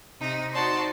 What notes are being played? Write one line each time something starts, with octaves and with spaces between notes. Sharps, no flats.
C3 D#4
D#4 F#4 C5 D5 A5 C6